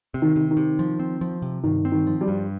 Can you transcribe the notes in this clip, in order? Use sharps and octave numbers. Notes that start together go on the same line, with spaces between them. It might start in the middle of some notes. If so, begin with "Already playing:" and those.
C3
D#3
C3
D#3
C3
F3
C4
F3
C3
G2 D#3
C4
D#3
F3
G3
G2